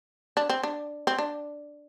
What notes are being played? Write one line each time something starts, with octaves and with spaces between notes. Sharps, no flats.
D4
C4
D4
C4
D4